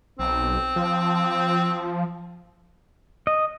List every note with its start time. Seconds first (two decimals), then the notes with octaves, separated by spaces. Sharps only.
0.19 B1 C4
0.76 F3
3.27 D#5